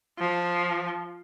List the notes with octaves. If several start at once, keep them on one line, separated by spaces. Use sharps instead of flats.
F3